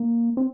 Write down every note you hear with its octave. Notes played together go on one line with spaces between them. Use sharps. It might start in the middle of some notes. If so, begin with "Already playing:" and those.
Already playing: A#3
C4